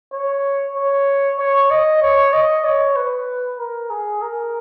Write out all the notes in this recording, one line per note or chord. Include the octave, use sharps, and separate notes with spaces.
C#5
C#5
C#5
D#5
C#5
D#5
C#5
B4
A#4
G#4
A#4